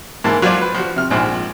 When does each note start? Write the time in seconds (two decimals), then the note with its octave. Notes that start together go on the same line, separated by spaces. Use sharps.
0.24 G#2 E3 A#3 A5
0.42 F#3 F4 C5 D5
0.61 B4
0.74 F3 F#4
0.96 C3 F6
1.10 A#1 G#2 F3